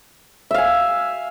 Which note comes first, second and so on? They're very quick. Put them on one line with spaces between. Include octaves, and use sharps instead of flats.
E5 F5 G#5